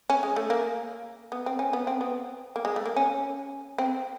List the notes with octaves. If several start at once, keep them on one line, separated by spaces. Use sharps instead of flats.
C#4
G#3
A3
A#3
B3
C4
C#4
B3
C4
B3
A#3
G#3
A3
A#3
C#4
C4